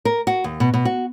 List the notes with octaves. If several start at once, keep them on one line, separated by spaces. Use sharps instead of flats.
A#4
F#4
D#2
B2
B2
F#4